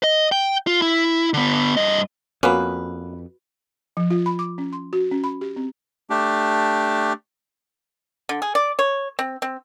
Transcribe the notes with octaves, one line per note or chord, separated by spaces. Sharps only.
D#5
G5
F4
E4
D3 B3
G2 D#5
F2 A#3 B3 C#4 F#4 B4
F3
F4
B5
D6
C#4
C6
F#4
C#4
B5
G4
C4
A3 D4 G4
D3
G#4
D5
C#5
C4
C4